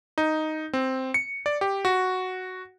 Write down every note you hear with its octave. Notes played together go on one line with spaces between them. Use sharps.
D#4
C4
C#7
D5
G4
F#4